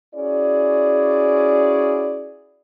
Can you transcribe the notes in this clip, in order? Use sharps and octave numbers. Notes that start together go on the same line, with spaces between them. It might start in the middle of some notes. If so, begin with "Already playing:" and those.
C#4 E4 F#4 G#4 D5